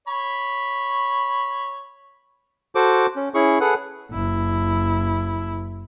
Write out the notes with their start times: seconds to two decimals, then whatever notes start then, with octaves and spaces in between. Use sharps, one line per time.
0.08 C#5 B5
2.75 F#4 A4 C5 D6
3.16 C#4
3.34 C#4 E4 G#4 C#6
3.60 G#4 A4 B4 F#5
4.11 F#1 E4